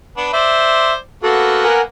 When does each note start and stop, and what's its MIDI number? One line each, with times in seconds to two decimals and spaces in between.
0.17 0.29 59
0.17 0.29 62
0.17 0.29 71
0.33 0.96 72
0.33 0.96 74
0.33 0.93 76
1.23 1.83 58
1.23 1.83 59
1.23 1.63 66
1.23 1.63 69
1.64 1.81 70
1.64 1.81 78
1.64 1.81 80